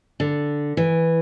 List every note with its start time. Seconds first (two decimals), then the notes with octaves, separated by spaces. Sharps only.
0.20 D3
0.77 E3